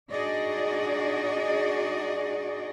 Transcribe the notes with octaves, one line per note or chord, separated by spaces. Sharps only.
D4 D#4 F#4 G#4 D5 D#5